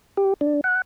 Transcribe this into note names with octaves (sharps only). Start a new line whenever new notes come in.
G4
D4
F#5